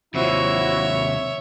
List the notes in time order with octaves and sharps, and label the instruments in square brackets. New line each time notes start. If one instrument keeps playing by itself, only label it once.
[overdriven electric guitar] D#2 C3 [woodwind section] F3 E4 F#4 [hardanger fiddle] C#5 E5